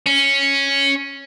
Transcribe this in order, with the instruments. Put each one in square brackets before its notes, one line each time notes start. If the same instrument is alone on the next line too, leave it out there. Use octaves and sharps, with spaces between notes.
[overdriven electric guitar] C#4